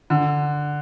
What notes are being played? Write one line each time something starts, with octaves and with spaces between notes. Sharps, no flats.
D3